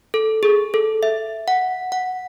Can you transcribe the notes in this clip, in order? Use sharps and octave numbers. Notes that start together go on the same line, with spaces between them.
A4
G#4
A4
E5
F#5
F#5